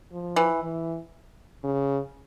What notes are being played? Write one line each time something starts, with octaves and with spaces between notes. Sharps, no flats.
F3
E3
E3
C#3